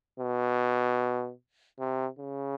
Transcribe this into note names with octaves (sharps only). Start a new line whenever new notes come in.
B2
C3
C#3